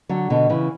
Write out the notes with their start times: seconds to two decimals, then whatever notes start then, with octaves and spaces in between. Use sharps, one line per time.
0.09 D3 F#3
0.30 B2 D3
0.49 C#3 E3